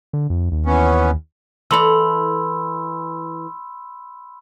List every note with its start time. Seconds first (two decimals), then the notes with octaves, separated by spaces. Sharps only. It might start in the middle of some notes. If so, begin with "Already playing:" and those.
0.13 D3
0.30 F2
0.52 D#2
0.66 E3 B3 C#4
1.71 E3 A4 D5 B5 C6 E6